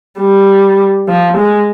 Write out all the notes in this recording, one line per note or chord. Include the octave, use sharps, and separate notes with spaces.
G3
F3
G#3